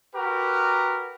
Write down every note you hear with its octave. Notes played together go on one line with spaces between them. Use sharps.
F#4 G4 A#4 B4